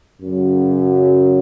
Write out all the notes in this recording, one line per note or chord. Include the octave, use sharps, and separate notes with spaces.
F#2 C#3 F#3